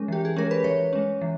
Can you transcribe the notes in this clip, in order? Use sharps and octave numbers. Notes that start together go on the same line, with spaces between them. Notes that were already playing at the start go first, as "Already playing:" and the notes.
Already playing: G#3 C#4 A#4
E3 G4
G#4
G#3 C#4 A#4
B4
E3 C#5
G#3 C#4
E3